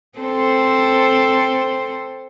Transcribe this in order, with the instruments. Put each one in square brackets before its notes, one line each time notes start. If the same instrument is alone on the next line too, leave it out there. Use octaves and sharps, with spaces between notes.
[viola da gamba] C4 A4 C5